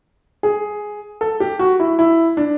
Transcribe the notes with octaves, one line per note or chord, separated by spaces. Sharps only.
G#4
A4
G4
F#4
E4
E4
D4